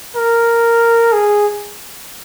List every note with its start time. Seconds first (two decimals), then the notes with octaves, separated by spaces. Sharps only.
0.15 A#4
1.13 G#4